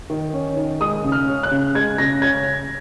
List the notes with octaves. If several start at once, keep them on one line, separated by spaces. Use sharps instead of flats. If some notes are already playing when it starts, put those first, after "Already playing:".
D#3
C#4
D#3
G#3 D#6
C#3
F6
C#4
F#6
C#3
G#3 G#6
C#3 A#6
C#4 G#6